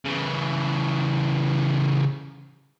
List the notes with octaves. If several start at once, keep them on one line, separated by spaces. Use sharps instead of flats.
C#3 E3